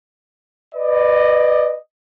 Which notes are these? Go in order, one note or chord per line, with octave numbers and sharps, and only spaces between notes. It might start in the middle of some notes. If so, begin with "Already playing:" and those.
B4 D5 D#5